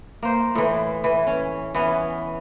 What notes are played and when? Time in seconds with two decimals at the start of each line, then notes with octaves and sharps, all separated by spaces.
0.23 A#3 C5
0.55 A2 E3
1.04 E3
1.27 C#4
1.75 E3 B3 C#4